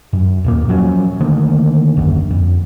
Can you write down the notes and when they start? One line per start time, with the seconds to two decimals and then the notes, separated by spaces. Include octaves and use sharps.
0.13 F#2
0.44 D#2 A#2 A#3
0.69 F3 F#3 C#4
1.20 D3 D#3 A3 A#3
1.96 D#1 A#1 F#2 D3
2.31 F2